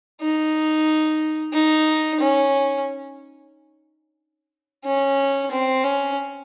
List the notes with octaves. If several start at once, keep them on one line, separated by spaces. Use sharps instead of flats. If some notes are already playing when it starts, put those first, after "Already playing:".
D#4
D#4
C#4
C#4
C4
C#4